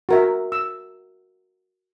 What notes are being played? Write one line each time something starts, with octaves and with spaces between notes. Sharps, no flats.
F#4 A#4 E5
E6